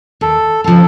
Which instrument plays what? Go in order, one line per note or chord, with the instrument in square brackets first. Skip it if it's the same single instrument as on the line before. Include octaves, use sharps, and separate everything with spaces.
[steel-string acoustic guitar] D#2 [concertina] A4
[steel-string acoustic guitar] C#3 F3 C4 [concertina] A4